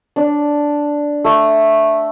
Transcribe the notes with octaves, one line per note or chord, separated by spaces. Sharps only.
D4
A3